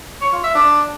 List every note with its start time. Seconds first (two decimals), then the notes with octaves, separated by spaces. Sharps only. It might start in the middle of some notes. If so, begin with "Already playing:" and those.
0.21 C#5
0.33 F4
0.44 E5
0.55 D4